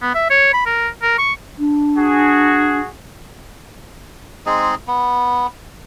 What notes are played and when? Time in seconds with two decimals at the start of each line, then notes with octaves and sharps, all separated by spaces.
0.02 B3
0.15 E5
0.30 C#5
0.53 B5
0.66 A#4
1.02 A#4
1.18 C#6
1.59 D4
1.97 F#4 G#4
4.46 G#3 C4 D#4 G#4
4.87 B3